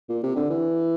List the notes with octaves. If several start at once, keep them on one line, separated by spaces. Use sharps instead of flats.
A#2
C3
D3
E3